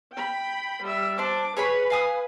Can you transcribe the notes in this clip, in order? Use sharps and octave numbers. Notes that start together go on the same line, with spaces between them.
G5 B5
G3 E5
D4 C5 D6
G#4 B4 C#5 B5
F5 G#5 D#6